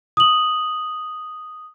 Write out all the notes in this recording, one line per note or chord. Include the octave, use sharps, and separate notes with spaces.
D#6 F#7